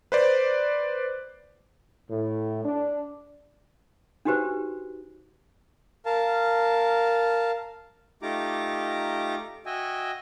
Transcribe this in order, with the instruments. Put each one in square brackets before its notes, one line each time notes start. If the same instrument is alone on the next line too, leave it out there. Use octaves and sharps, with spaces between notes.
[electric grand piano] B4 C5 D5
[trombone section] A2
D4
[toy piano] D4 D#4 F#4 G4 B4 C5
[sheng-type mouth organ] A#4 F5 A5
A3 D#4 F4 G4 A#5 D6
F#4 D#5 E5 G5 G#5